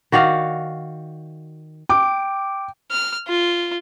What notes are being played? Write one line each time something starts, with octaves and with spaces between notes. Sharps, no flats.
D#3 F#4 D5 F5
G5 D6
F6
F4